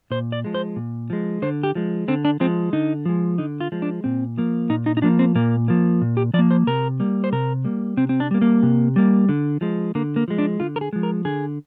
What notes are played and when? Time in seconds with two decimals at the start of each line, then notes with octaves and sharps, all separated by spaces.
0.11 A#2 C5
0.32 D5
0.44 F3 G#3
0.54 C5
0.76 A#2
1.10 F3 G#3
1.42 D3 C5
1.63 G4
1.75 F3 G#3
2.08 D3 C4
2.25 D4
2.40 F3 G#3 C4
2.73 D3 D#4
3.06 F3 G#3
3.38 D3 D#4
3.60 F4
3.72 F3 G#3
3.82 D4
4.04 A#2 C4
4.37 F3 A#3
4.69 A#2 D#4
4.86 D#4
4.97 D#4
5.02 F3 A#3 D4
5.19 C4
5.35 A#2 A#3
5.68 F3 A#3
6.01 A#2
6.17 G4
6.34 F3 D5
6.39 A#3
6.51 C5
6.67 C3 A#4
7.00 G3 A#3
7.24 C5
7.32 C3 A#4
7.64 G3 A#3
7.97 C3 C4
8.09 C4
8.20 D4
8.31 G3 A#3
8.42 A#3
8.63 C3
8.96 G3 A#3
9.29 D3
9.61 F3 G#3
9.95 D3 A#3
10.16 A#3
10.28 F3 G#3
10.38 D4
10.60 D3 F4
10.76 A#4
10.81 G#4
10.93 F3 G#3
11.03 A#4
11.25 D3 G#4